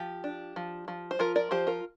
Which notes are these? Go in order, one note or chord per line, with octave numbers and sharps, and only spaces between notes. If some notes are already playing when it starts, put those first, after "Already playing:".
Already playing: F3 G4
D4
F3
F3
C5
F3 F4 A#4
A#4 D5
F3 G4 C5
F4 A#4